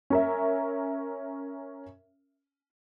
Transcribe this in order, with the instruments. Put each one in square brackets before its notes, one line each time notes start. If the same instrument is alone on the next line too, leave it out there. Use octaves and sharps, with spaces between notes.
[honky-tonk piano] C#4 A#4 E5